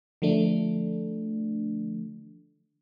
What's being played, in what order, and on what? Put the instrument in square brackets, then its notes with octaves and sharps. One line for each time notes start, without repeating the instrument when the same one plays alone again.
[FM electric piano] D3 F3 A3 D4